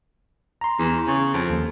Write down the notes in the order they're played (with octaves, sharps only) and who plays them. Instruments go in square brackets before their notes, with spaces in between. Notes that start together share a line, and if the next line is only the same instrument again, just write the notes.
[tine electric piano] A#5 C6
[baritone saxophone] E2
C#3
F2
[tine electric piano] D#2